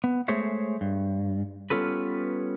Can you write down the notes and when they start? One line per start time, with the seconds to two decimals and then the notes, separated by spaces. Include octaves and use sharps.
0.04 B3
0.28 G#3 A3 G#4 C5 C#5 E5
0.81 G2
1.70 G3 B3 C#4 F4 A4 B4